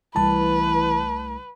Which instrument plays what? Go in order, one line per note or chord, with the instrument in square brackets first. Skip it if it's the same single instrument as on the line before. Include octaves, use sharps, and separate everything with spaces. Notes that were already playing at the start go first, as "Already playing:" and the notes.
[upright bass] C2 A3 [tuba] E3 [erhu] B4 [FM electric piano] A5